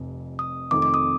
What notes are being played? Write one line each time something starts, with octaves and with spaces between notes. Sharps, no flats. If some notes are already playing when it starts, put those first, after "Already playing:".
Already playing: F1 F2 C3
D#6
F2 C3 D#3 A3 D6
D6
D#6